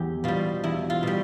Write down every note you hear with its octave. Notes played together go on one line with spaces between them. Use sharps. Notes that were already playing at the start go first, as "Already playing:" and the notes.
Already playing: E2 G4
B2 G3 F4
E2 E4
F4
B2 G3